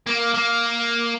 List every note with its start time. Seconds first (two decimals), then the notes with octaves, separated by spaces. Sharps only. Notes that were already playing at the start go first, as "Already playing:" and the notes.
0.07 A#3
0.34 A#3